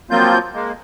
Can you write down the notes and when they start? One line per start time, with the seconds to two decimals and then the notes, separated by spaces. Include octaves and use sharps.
0.11 F3 F#3 A#3 C4 F4 G6
0.54 G#3 A#3